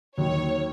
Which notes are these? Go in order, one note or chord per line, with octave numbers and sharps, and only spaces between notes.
D#2 D#3 F#3 C#5